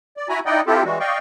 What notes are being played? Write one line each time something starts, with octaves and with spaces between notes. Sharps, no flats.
D5
E4 F#4 G#5 A#5 B5
D#4 E4 D5 D#5 F#5 G5
C4 E4 F4 G4 A4
E3 G3 G#3 F#4
D5 D#5 F5 G5 C#6